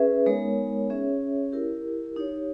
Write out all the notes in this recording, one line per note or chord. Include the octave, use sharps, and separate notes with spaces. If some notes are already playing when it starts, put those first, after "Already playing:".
Already playing: C#4 G#4 B4 E5
G#3 B3 D#4 A#4 C#5
C#4 G#4 C#5 E5
E4 G4 A#4
D#4 G4 C#5